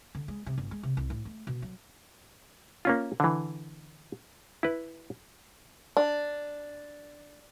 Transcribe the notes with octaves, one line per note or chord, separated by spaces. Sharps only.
D3
G#3
C3
G1
G#3
C3
C2
A2
A3
B2
F#3
A#3 C#4 F4
D3 E3
E4 B4
D4